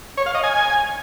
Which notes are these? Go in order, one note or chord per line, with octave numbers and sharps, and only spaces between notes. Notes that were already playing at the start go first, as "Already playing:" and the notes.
C#5
F5
D#5
G#5